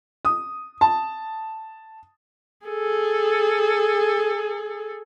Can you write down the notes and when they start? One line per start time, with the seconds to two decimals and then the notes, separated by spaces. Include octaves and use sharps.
0.25 D#6
0.81 A5
2.67 G#4 A4